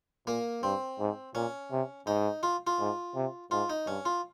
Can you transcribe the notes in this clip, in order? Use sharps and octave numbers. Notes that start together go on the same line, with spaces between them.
A#2 A#3
G2 C4
G#2
A#2 C#4
C3
G#2 D#4
F4
F4
G#2
C3
G#2 F4
D#4
G2 C#4
F4